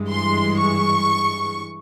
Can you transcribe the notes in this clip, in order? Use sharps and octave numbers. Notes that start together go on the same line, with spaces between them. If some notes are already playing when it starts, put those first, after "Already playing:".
Already playing: G2 E3 G#3
C6
C#6